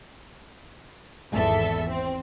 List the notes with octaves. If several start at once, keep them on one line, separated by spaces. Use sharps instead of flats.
G#1 E2 A4 E5
C4